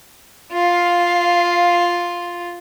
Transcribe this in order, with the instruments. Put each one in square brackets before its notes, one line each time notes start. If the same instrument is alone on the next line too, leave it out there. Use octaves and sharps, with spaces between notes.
[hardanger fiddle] F4 [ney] F5